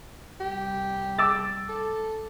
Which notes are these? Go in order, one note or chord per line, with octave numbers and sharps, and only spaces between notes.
C2 G3 G4
D6 E6 A6
A4